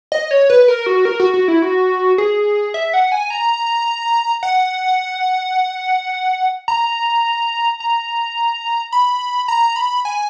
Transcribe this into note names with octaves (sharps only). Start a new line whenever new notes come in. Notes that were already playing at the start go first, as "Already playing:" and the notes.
D#5
C#5
B4
A#4
F#4
A#4
F#4
F#4
E4
F#4
G#4
E5
F#5
G#5
A#5
F#5
A#5
A#5
B5
A#5
B5
G#5